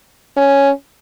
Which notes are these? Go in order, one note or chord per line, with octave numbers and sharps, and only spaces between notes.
C#4